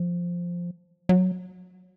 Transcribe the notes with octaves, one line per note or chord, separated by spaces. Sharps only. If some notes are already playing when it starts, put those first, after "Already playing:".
Already playing: F3
F#3